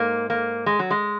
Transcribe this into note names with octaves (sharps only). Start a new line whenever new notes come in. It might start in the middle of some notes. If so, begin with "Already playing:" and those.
Already playing: G#2 A#3
A#3
G#3
F#3
G#3